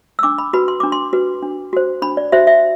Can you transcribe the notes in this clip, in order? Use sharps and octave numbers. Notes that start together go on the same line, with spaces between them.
E6
D4 D6
B5
F#4 B4 B5
C6
D4 D6
C6
F#4 B4
D4
F#4 C5
D4 B5
D5
F#4 C5 E5
E5